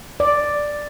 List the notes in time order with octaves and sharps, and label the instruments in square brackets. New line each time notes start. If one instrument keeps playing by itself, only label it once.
[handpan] D5